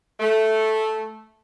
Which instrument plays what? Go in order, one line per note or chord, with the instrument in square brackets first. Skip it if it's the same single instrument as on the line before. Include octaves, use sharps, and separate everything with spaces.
[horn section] A3